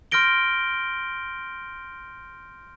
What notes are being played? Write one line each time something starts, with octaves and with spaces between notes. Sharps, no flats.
C6 F6 G6 A#6 D7 G7